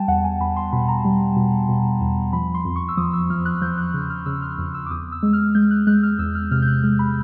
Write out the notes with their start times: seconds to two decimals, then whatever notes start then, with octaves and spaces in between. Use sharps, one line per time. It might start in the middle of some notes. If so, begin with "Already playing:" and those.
Already playing: G3 G5 A5
0.08 E2 F#5
0.24 G#5
0.40 E2 B5
0.57 C6
0.73 B2 B5
0.89 A#5
1.05 G3
1.36 B2
1.69 B2
2.01 E2
2.33 F3 B5
2.55 C6
2.65 F2
2.76 C#6
2.89 E6
2.97 F3 D#6
3.13 E6
3.30 F3 F6
3.46 F#6
3.62 F3 G6
3.78 F#6
3.94 C#3
4.10 F6
4.26 C#3 E6
4.42 F6
4.58 F2 F6
4.74 E6
4.86 D6
4.90 E2 D#6
5.12 E6
5.23 G#3
5.33 F6
5.55 G#3 G6
5.71 F#6
5.87 G#3 F#6
6.03 F6
6.19 E2 E6
6.35 F6
6.51 C3 F6
6.62 G6
6.68 F#6
6.83 G#3 F6
6.99 B5